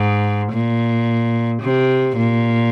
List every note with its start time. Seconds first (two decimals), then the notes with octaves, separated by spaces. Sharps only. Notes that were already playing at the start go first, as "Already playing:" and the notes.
Already playing: G#2
0.52 A#2
1.62 C3
2.17 A#2